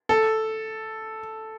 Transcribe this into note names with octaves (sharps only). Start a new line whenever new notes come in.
A4